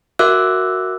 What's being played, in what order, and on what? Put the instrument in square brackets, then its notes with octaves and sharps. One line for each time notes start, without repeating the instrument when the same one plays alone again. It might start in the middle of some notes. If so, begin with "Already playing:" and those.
[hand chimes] F#4 A#4 E5 D6 E6 F#6